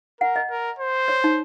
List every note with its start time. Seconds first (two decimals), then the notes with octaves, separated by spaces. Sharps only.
0.21 A#4 F#5
0.36 D#5
0.50 A#4
0.79 C5
1.08 C#5
1.24 D#4